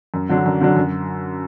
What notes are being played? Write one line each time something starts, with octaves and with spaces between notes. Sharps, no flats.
F#2
D3 F#3 D4
F#2
D3 F#3 D4
F#2